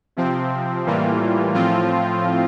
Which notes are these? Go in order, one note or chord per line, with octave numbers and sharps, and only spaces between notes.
C3 F3 C4
A2 E3 G3 A#3 F4
A2 F3 C4 F4